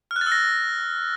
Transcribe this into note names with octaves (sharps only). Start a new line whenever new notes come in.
F6
F#6
A6
E6
A#6